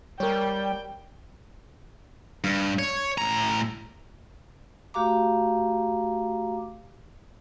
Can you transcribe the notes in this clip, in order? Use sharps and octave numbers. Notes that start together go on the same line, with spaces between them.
G3 A#4 C#5 G5
G2
C#5
A2 A#5
A3 F#4 G4 F5 A#5 D6